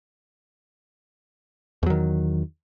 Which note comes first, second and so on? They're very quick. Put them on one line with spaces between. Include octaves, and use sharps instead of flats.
E2 F#3 D#3